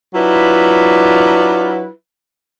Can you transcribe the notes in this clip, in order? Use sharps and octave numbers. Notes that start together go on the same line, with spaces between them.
F#3 D4 E4 F4 B4